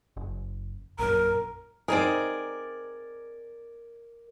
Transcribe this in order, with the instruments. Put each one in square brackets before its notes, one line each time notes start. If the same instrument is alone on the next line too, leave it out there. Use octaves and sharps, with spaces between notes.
[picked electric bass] F#1
[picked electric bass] A#1 F#2 [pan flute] A#4 [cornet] A#5
[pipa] C4 D#4 G#4 [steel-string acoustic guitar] A#4 D5